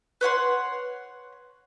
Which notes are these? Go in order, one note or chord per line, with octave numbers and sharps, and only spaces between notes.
B4 C#5 F#5 C6